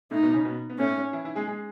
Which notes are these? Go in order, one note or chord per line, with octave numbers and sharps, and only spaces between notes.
A2 A3 D#4
B2 B3
C#3 C#4
B2 B3
B3
A2 A3 C#4
E3 E4
E3 E4
G#3 G#4
G#3 G#4